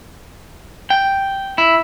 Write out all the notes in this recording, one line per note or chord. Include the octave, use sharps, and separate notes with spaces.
G5
E4